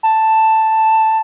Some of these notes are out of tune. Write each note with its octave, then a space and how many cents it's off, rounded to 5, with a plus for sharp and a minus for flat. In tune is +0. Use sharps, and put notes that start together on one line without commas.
A5 +5